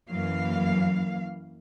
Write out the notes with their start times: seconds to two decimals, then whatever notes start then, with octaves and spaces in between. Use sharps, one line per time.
0.10 F#2 E3 F#3 A#3 F5